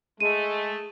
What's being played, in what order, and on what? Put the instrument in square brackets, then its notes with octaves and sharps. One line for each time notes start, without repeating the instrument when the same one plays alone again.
[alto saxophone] G#3 [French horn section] A3 [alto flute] G#4 [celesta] D#7